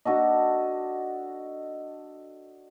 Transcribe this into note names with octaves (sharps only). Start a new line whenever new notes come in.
D4 F#4 A4 D#5